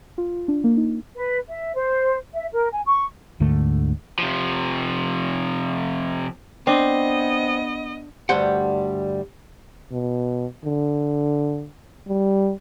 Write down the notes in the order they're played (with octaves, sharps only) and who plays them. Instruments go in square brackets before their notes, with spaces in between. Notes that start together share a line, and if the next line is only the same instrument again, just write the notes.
[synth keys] F4
D4
A#3
D#4
[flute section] B4
E5
C5
E5
A#4
G#5
C#6
[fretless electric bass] D2 G#2 D3 A3
[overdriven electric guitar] C3 F3
[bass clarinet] B3 [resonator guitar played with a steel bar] C4 [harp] D4 [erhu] D#5
[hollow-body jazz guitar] D2 G2 G3 A3 C5 F#5
[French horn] B2
D3
G3